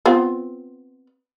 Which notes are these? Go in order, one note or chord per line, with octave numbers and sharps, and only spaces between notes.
B3 C4 F4